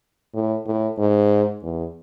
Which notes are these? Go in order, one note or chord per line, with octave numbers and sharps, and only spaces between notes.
A2
A2
G#2
E2